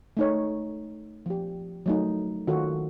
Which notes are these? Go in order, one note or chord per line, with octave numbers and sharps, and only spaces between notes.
A3 D#4 C#5
F3 G4
F#3 A3 D#4
D#3 F4 F#4 A4